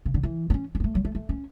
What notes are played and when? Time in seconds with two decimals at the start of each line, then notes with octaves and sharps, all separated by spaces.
0.05 C#3
0.14 D3
0.23 E3
0.50 B3
0.54 C#4
0.75 C#4
0.80 B3
0.84 A3
0.95 F#3
1.05 A3
1.15 A3
1.29 C#4